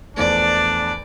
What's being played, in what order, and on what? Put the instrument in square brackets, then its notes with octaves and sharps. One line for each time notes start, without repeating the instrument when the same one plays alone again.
[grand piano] E2 F3 A3 [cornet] D4 [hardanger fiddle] D5